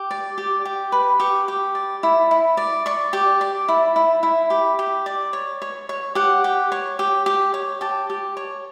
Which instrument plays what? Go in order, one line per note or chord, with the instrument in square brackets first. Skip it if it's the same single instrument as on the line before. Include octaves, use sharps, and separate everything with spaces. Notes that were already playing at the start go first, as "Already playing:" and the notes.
Already playing: [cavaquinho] G4
D5
G4
G4
B4
G4 C#6
G4
D5
E4
E4
D5
D5 C#6
G4
D5
E4
E4
E4
G4 B5
G4
D5
C#5
C#5
C#5
G4 F#5
G4
C#5
G4
G4
C#5
G4 A5
G4
C#5